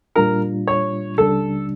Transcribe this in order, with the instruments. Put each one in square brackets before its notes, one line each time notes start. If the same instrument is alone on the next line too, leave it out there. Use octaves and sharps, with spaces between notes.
[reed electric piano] A#2 G3 D4 F4 [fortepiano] A#4
[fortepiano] C#5
[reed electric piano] C#2 C#3 G3 D4 [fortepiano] A4